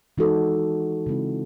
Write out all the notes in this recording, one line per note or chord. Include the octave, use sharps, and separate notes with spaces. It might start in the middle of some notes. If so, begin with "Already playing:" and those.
E3 G#3 D#4 F#4 A4
C#3 G#3 C4 E4